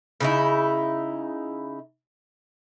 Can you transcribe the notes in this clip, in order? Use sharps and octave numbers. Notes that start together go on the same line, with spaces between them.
C#3 D#4 E4